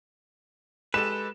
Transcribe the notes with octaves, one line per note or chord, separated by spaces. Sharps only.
G#3 G4 A4 B4 E7